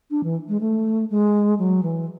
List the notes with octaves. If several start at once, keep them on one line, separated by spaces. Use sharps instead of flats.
D4
E3
G#3
A3
G#3
F#3
E3